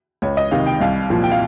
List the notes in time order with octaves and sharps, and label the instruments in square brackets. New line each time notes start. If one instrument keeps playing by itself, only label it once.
[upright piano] C#2 C#5
D#5
C3 D#3 F5
G5
C2 F5
A#2 F3
G5
F5